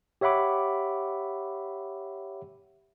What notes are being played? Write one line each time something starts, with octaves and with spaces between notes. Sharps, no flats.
G4 C#5 E5 F#5 B5 D6